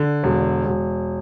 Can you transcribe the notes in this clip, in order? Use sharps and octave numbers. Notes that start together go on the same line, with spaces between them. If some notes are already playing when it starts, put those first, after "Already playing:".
Already playing: D3
E1
E1